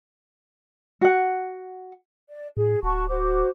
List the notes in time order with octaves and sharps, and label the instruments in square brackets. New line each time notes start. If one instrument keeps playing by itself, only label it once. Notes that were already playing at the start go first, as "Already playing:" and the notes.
[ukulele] F#4 F#5
[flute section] D5
[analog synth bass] A2 [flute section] G#4
[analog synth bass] D1 [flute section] F#4 A5 C#6
[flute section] F#4 C5 D6